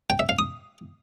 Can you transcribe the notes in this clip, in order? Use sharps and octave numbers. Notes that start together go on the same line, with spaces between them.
G5
E5
F5
D#6